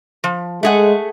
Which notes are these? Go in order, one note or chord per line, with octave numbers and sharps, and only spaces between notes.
F3
G#3 A3 G#4 F#5